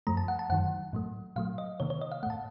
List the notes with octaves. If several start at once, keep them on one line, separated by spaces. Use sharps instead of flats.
F#2 F3 A3 A#5
A5
F#5
A5
F#2 D#3 F#3 F#5
A2 F#3 A3
A#2 F#3 A3 F5
D#5
C3 D#3 A#3 C#5
C#5
D#5
F5
A2 A3 F#5 A5